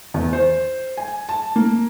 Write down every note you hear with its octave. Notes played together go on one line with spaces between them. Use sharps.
E2
C5
G#5
A5
A#3